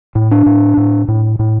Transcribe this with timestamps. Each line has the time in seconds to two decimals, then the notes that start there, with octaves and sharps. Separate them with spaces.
0.15 A2
0.31 D4
0.46 A2
0.77 A2
1.08 A2
1.39 A2